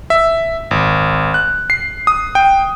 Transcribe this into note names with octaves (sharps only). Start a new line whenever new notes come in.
E5
G#1
F#6
C7
D#6
G5